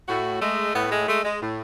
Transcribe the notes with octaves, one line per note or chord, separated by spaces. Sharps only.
A2 F#4
G#3 A3
A2 B3
G#3
G#3 A3
G#3
A2